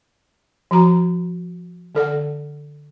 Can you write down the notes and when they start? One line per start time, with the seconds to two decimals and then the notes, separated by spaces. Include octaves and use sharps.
0.71 F3 F#4 A#5
1.95 D3 A4 D5 F#5